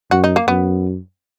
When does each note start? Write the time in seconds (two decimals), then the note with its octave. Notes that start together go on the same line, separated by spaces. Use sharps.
0.11 F#2 F#4
0.24 D#4
0.36 A#3
0.48 F#2 B3